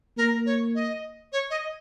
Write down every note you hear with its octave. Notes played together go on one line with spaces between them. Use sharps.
A#3 A#4
C#5
D#5
C#5
D#5